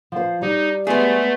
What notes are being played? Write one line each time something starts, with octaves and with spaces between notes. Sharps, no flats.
F3 C5
G3 D#4
G#3 A3 B3 G#4